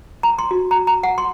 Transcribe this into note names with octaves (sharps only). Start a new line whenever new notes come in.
A#5
C6
F#4
A#5
A#5
F#5
C6